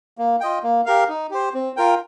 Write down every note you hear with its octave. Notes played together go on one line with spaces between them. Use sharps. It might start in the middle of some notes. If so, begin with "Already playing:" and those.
A#3
F4 D#5 G5
A#3
G4 A#4 F5
D#4
G4 C5
C4
F4 A#4 G5